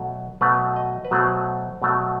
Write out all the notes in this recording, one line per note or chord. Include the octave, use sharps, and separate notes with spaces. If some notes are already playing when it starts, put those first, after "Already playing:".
Already playing: B2 F#3 A3
B2 F#3 A3 B4
D#5
B4
B2 F#3 A3 C5
B2 F#3 A3